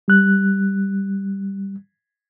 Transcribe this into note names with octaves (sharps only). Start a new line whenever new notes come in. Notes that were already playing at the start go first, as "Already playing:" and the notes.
G3 F#6